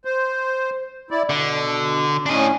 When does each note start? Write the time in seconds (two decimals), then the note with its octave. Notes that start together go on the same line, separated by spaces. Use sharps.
0.05 C5
1.11 E4 D5
1.30 B2 D3
2.26 A2 C#4 D4 D#5